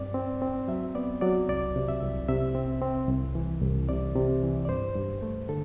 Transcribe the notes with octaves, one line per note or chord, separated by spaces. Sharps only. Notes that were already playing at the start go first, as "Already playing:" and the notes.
Already playing: G2 C4 D5
C4
C4
F#3 E5
B3 D5
F#3 D5
C2 D5
C3
E5
C2
C3 E5
C4
C4
C2
E3
C2
C3 D5
C3
E3
D5
G2 C5
G2
A3
D3 A4